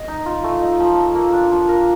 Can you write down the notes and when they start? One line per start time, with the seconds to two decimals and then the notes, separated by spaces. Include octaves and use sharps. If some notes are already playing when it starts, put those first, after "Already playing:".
Already playing: D#5
0.08 D#4
0.26 F4
0.44 A3
0.62 D#4
0.80 F3
0.97 A4
1.15 A#3
1.33 D4
1.52 F3
1.69 A#4